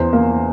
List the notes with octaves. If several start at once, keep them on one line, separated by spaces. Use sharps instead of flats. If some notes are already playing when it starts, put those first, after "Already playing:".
Already playing: E2 C5
A#3